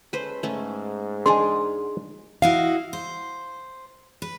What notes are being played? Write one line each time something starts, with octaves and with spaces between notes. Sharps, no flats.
G#3 C#4 A4 B4 C5
G#2 A3 C#4
D4 D#4 G#4 A#4 G#5 C6
E4 F#4 D#5 F5
C5
B4